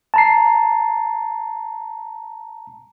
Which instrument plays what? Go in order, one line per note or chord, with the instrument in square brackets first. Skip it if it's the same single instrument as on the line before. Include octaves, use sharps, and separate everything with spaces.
[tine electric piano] A5 A#5 C7